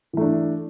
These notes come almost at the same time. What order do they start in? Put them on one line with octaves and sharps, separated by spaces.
E3 A3 D4